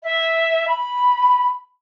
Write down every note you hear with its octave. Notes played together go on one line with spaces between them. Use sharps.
E5
B5